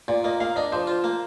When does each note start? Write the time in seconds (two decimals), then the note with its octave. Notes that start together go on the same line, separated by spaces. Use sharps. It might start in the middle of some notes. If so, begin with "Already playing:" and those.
0.08 A#2 D5
0.24 A#3 D#5
0.40 A#3 F5
0.56 D4 D#5
0.72 F3 C5
0.87 F4
1.04 A#3